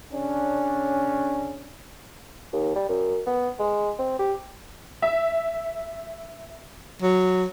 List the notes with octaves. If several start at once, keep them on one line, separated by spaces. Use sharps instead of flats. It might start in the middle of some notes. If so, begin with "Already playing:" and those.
C#3 C#4 D4
D#2
G3
F#2
B3
G#3
C4
G4
E5
F#3